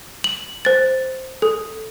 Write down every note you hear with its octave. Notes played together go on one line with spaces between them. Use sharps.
F#7
C5 A6
A4